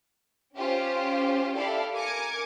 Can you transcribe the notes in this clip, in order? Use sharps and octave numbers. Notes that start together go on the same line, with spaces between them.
C#4 F4 G4 C5
E4 G4 A4 D5 F5
A#4 G#5 D6 G#6 C#7